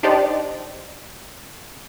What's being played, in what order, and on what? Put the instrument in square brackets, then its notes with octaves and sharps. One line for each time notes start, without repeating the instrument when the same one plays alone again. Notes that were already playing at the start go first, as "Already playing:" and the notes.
[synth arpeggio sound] D4 D#4 G4 C5 D5